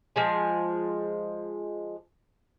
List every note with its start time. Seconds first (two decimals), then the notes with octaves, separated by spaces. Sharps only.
0.16 F3 G#3 G#4